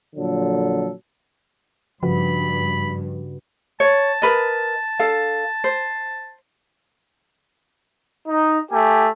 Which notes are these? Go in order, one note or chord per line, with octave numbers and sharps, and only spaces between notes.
A#2 D3 F3 F#3 A4
G2 C#3 F3 F#4 B4 B5
C#5 A5
A#4 B4 D#5
D4 A4 F5
C5
D#4
A3 G4 G#5